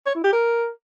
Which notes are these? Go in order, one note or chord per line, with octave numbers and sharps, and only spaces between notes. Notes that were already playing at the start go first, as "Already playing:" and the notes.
C#5
E4
G4
A#4